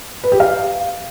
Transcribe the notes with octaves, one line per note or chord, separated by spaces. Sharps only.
B4
G4
F5